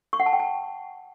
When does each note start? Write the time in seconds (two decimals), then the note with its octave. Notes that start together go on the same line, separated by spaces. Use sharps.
0.13 C#6
0.20 F#5
0.26 A5
0.33 G5
0.40 A5